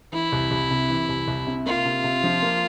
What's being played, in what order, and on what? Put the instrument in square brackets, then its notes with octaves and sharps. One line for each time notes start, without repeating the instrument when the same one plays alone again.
[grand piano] E3 [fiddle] E4
[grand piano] C2
C2
C3
E3
C2
C2
C3
[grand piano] A#3 [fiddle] F4
[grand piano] C3
C3
F3
A#3